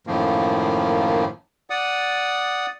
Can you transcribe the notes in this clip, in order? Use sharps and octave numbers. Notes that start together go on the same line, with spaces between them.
F#2 A2 D#3 F3 A#3
D5 F#5 D#6